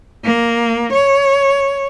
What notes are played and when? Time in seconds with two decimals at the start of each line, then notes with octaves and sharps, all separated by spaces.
0.25 A#3
0.93 C#5